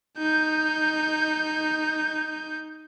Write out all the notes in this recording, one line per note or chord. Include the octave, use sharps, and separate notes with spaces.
D#4 G6